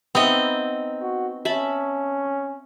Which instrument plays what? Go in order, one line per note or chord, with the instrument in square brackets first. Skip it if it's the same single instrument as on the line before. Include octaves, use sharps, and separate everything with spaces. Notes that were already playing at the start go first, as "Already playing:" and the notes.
[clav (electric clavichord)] B3 [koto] C4 D#5 [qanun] D#4 E5 A#5
[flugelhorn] F#4
[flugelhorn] C#4 [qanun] E5 A5 B5